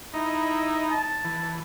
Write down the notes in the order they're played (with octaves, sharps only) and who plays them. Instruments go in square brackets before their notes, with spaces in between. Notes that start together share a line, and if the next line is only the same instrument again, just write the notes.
[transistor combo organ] D#4 [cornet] E4
[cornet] A5
[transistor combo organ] E3